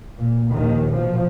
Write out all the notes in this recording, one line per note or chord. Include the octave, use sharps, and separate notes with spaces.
A#2
A#1 D#2 D#3
B2 F3